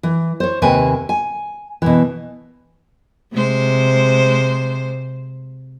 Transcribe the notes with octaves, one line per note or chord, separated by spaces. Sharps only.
E3
C5 C#5
D#2 C3 A#3 B4 G#5
G#5
B2 E3
C3 G#3 C5